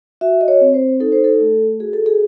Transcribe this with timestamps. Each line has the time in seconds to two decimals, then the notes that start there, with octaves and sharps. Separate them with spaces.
0.21 F#4 E5
0.41 D#5
0.48 C#5
0.61 C4
0.74 C5
1.00 D#4 A4
1.12 C5
1.24 A4
1.40 A3
1.80 F#4 G#4
1.93 A4
2.06 G#4